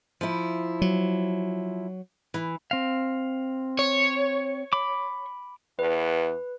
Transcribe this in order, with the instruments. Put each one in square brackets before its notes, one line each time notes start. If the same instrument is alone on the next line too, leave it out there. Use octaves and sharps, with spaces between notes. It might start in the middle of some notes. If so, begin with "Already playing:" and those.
[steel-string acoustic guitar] F3 E4
[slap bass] F#3
[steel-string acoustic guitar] E3
[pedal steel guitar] C4 F5
[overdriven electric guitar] C#5
[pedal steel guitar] B5 D6
[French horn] E2 [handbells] B4